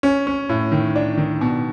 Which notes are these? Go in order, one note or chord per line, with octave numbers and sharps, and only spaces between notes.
C#4
C#4
A2
D#3
D4
D#3
B2